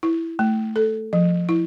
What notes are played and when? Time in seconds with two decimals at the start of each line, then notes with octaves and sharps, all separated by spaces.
0.03 E4
0.39 A3
0.76 A4
1.13 F3
1.49 E4